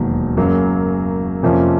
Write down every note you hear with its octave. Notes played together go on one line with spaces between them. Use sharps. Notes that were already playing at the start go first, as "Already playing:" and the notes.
Already playing: E1 D#2 D#3 F#3
F#2 C#3 F#3 A#3
F2 C3 F3 A#3 C#4